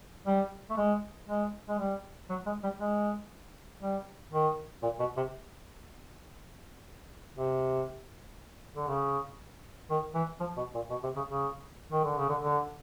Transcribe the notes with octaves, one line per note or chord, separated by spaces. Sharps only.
G3
A3
G#3
G#3
G#3
G3
F#3
G#3
G3
G#3
G3
D#3
A#2
B2
C3
C3
D3
C#3
D#3
E3
F3
B2
A#2
B2
C3
C#3
C#3
D#3
D3
C#3
D3
D3